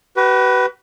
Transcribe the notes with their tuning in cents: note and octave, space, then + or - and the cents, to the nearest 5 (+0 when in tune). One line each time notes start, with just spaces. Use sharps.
F#4 +45 B4 +0